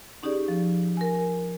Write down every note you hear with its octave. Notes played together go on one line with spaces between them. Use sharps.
C#4 D#4 G4 G#4 D5
F3
A#4 G#5